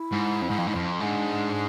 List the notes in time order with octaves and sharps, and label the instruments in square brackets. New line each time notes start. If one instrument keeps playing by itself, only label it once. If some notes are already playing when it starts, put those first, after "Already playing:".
Already playing: [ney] E4
[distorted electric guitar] G#2
F2
G#2
F2
G#2
F2
[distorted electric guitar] G#2 [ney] D4